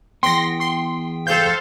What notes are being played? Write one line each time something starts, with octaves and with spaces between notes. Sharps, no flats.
E2 B3 G5 C6 A#6
C6
A4 C5 F5 G6